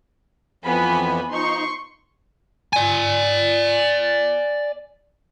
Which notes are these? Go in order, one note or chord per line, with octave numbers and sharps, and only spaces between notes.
F2 E3 F3 B3 G#5 B5
F3 D#4 C6 C#6
D5 G#5